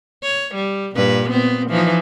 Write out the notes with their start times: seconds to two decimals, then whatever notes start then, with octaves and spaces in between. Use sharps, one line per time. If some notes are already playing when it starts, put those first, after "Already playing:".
0.23 C#5
0.55 G3
0.95 G2 A#2 B4
1.30 A#2 B3 C4
1.68 E3 F3 D#4